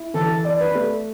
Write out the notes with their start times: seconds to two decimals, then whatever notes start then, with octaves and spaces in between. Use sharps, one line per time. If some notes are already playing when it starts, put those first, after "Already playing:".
Already playing: E4
0.14 E3 A4
0.44 D5
0.60 B4
0.75 A3